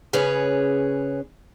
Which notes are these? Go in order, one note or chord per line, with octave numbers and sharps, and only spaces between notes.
C#3 C#4 G#4 B4 C#5